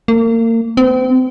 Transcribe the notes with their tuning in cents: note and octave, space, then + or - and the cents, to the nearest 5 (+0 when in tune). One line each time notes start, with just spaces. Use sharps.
A#3 -35
C4 -35